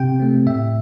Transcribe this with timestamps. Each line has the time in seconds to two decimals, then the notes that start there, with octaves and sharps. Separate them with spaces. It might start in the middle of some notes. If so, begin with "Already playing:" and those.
Already playing: C3 G5
0.20 A3 C4
0.46 A2 E5